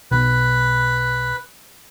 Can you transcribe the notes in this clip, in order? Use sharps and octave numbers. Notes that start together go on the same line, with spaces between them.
B1 B4